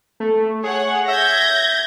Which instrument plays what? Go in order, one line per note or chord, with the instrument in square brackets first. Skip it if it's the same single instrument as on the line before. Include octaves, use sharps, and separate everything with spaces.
[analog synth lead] A3
[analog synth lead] G#4 [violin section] C#5 F#5
[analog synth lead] E5 [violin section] G6 G#6 A#6